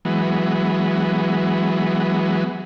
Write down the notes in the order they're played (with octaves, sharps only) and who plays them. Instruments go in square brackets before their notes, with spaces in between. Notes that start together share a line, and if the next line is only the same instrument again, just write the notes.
[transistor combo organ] E3 F#3 G#3 B3